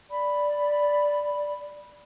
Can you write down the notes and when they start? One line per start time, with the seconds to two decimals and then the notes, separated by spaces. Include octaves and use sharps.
0.11 D5 B5